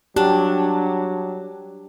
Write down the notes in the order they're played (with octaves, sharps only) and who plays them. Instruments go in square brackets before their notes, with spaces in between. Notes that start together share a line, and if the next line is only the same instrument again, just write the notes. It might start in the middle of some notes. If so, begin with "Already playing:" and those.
[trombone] F#3 [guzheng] D4 [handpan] G4